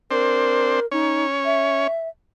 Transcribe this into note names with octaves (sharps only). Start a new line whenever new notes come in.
C4 D4 A#4 C5
C#4 D#4 C#5
E5